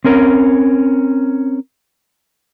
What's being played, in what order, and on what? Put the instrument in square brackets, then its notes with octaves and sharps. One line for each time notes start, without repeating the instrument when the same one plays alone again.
[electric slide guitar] C4 C#4 A#4